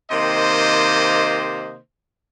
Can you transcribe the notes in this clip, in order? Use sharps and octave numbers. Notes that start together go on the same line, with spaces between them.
C3 D#3 A#3 C5 D#5